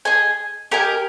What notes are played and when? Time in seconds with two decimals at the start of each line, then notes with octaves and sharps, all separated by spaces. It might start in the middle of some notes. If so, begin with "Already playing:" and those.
0.05 G#4 D#5 G#5
0.71 G4 A#4 D#5 G#5